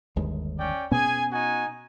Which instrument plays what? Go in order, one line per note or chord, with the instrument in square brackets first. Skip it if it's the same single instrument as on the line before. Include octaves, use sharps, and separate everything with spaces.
[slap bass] G1 D#2 G#3
[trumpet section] C#4 D5 G5
[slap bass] B2 B3 C#4 [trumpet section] G#4 G#5
[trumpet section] D#4 F#4 G#5